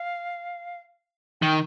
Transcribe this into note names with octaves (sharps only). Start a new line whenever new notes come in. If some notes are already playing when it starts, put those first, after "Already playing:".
Already playing: F5
D#3 G5